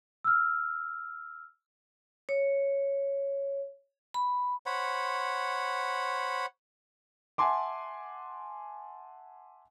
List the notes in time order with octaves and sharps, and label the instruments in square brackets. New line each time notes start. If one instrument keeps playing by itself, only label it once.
[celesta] E6 F6
[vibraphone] C#5
B5
[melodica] C5 C#5 F#5 B5
[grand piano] E5 F#5 G#5 A5 C6 D6